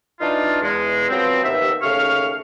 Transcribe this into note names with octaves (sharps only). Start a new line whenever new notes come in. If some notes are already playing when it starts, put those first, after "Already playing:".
E3 D4 D#4 F4
E2 G#3
F3 F#3 B3 C4
D#2 C3 B3 E5
D#2 C#3 A3 F5 C#6 F6